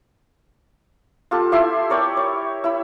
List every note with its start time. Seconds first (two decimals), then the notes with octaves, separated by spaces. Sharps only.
1.31 F4 G4 A4 A5
1.52 E4 G4 E5 C6
1.90 A#4 C#5 D5 G5
2.17 C#5
2.64 E4 B5